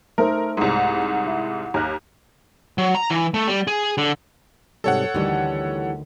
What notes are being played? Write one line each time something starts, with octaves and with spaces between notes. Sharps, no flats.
A3 D#4 A#4 C5
C2 G#2
E4
D#2 A#5 F6 F#6
F#3
A#5
E3
A3
G3
G#4
D3
G#2 C3 G3 A4 C#5 F#5
D2 D#3 E3 G3